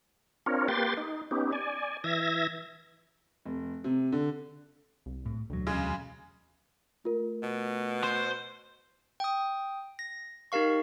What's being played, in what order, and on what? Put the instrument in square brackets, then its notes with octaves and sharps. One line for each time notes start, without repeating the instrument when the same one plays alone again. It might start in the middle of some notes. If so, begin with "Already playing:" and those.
[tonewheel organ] C4 D4 F4 A#4 C#5
A#3 G4 B4 G5 C6 A6
D#4
B3 C#4 D#4 G4
D5 G#5
E3 E5 G#6 A#6
[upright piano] F1
C3
D3
[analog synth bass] C2
[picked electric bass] A2
[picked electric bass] E1 F#3 [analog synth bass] D2
[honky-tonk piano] C#3 G#3
[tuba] A3 [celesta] F4 A#4
[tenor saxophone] B2
[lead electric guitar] C5
[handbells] G5 D#6
A#6
D#4 G4 A#4 F5 C#6